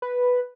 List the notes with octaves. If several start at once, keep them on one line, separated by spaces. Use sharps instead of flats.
B4